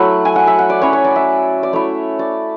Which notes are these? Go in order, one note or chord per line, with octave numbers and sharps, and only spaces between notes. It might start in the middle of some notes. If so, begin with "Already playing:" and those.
Already playing: F#3 A3 E4 F#5
G#5
F#5
E5
F#5
D5
F#3 C#4 E4 C#5
C#5
D5
E5
D5
A3 E4 C#5
D5